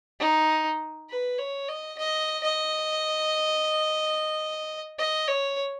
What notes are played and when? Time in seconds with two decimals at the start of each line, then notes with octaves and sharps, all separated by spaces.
0.19 D#4
1.09 B4
1.38 C#5
1.69 D#5
1.98 D#5
2.44 D#5
4.99 D#5
5.28 C#5